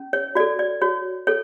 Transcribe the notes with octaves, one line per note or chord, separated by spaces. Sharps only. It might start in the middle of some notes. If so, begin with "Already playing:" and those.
Already playing: C#4
C#5
F#4 A4 D5
D5
F#4 C#5
A4 C#5